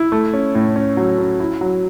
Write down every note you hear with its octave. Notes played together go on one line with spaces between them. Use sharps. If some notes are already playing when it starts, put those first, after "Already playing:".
Already playing: E4
A3
C#4
A2
C#4
F#3
C#4
E4
F#3